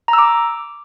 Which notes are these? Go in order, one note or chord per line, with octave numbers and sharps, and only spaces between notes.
A#5
E6
D6